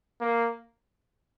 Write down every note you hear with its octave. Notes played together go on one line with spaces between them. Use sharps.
A#3